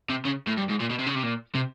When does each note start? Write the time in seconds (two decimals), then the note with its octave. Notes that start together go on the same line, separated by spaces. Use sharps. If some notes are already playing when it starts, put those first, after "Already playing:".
0.09 C3
0.25 C#3
0.47 A2
0.57 G2
0.69 G#2
0.80 A#2
0.90 B2
0.99 C3
1.06 C#3
1.15 C3
1.23 A#2
1.55 C3